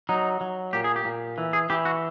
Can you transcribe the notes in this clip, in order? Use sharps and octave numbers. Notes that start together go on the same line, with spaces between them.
F#3 D#4
F#3
A#2 G4
G#4
G4
A#2
E3
G#4
E3 G4
F#4